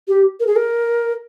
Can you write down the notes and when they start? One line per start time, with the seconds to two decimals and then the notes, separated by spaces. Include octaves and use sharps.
0.08 G4
0.40 A#4
0.47 G#4
0.56 A#4